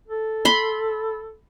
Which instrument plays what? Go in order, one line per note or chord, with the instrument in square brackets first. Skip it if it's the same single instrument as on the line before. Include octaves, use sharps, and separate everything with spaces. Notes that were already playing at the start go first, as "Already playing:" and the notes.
[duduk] A4
[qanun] B5 C6